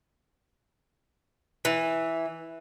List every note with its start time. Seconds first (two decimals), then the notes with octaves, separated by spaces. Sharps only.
1.65 E3